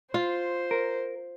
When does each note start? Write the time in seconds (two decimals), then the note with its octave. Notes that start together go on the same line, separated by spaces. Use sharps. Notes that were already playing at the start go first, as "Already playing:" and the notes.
0.14 F4 C5
0.71 A#4